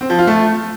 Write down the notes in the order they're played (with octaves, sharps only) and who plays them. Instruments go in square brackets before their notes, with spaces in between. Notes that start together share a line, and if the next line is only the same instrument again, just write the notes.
[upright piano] C4
F3
F4
A3